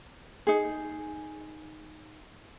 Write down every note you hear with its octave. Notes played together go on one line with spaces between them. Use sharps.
D#4 G#4